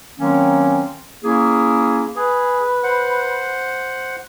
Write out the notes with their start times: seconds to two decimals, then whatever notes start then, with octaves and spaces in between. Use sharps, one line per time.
0.19 D#3 F#3 A#3 C4 C#4
1.24 A#3 C#4 E4 G#4
2.16 G#4 B4
2.84 C5 F#5